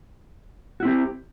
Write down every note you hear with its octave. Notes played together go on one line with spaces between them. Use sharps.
C4 E4 F#4 G4